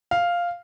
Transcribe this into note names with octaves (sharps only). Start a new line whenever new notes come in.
F5